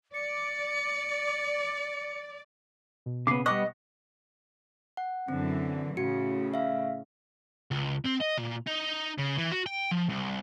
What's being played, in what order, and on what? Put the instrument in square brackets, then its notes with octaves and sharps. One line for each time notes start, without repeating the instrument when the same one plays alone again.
[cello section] D5 [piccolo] C#7
[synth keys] B2
[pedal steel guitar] C#3 B3 [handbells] D6 C7
[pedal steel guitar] G3 B3 F#6 [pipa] D#5 [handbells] C#6 D6
[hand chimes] F#5
[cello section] F#2 D3 E3 [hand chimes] C4
[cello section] A2 C#3 [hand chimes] F#4 C#7
[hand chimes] E5 F5
[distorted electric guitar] C#2
C4
D#5
A#2
D#4
C#3
E3
F#4
G5
F3
C2